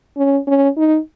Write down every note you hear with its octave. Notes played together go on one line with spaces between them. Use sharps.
C#4
C#4
D#4